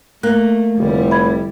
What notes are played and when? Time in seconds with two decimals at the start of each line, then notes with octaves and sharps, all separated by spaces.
0.23 A3 A#3 F#6
0.78 F1 D3 G3 E4
1.10 E5 B5 G#6